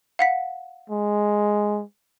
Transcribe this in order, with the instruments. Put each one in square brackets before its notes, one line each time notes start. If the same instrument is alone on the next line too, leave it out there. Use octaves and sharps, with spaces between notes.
[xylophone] F5 F#5 B6
[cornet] G#3